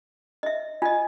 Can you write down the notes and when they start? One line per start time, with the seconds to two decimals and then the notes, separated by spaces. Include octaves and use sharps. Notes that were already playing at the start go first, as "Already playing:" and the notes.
0.43 D#5 E5
0.82 F4 D#5 G#5